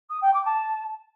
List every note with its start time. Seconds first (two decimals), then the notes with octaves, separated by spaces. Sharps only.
0.10 D#6
0.21 G5
0.33 D6
0.45 A5